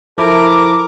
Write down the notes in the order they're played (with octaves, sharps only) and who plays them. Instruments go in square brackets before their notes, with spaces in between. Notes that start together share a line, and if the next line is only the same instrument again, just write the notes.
[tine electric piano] F3 E4 [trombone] A4 [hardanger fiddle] A#4 [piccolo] D6